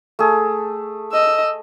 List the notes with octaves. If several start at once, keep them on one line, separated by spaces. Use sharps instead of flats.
A3 G#4
D#5 E6